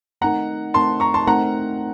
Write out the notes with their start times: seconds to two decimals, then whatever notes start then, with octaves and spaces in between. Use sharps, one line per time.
0.21 A3 C4 D#4 A#4 F#5 A#5
0.74 A3 C4 D#4 A#4 A5 C6
1.00 A#5 C#6
1.14 A5 C6
1.27 A3 C4 D#4 A#4 F#5 A#5